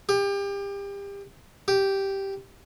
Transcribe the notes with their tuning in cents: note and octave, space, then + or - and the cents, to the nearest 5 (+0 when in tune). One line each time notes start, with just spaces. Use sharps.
G4 +30
G4 -5